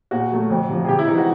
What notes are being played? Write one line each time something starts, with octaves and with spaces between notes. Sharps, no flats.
A#2 F#4
F#3 A3
F2
C3 F3
G#4
C3 G4
E4
E3 G#3 D#4
F#4